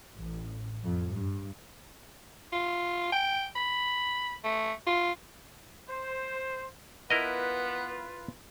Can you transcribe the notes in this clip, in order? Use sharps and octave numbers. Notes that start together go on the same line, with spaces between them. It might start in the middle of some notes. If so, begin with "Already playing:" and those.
A1
F2
G2
F4
G5
B5
A3
F4
C5
B3 E4 F4 A#4 B4 D#5